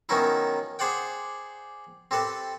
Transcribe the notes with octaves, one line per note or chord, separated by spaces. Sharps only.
D#3 F#3 B3 C#4 D#4 E4
G#4 C5 D5 F#5 G5
C4 G4 A4 B4